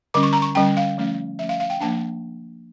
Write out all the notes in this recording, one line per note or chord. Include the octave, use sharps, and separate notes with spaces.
D3 G3 C#4 D6
C#6
A#5
C#6
D3 G3 C#4 G5
F5
F3 A3 C#4
F3 A3 C#4 E5
F5
F5
G5
F3 A#3 D4 A5